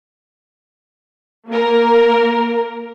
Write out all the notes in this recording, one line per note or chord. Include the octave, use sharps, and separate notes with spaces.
A#3 A#4